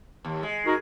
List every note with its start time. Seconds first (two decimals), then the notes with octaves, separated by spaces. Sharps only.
0.25 D#2
0.43 G#3
0.65 D#4 F#4 A#4